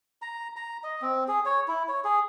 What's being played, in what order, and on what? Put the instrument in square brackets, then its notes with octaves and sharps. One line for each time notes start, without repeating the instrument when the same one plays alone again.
[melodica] A#5
A#5
D#5
C4
G#4
C#5
E4
C#5
G#4